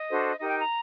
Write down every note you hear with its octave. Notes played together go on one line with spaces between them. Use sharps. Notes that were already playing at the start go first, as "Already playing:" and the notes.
Already playing: D#5
D4 F#4 A4 C5
D#4 G4 A#4 D#5
G5
A#5